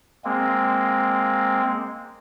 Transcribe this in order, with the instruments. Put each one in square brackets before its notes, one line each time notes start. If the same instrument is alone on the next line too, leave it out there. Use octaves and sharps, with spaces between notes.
[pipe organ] G#3 A#3 C4